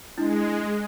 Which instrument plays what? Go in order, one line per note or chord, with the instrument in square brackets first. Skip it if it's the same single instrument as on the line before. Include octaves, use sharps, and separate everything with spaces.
[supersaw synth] G#3 [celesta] D4 E4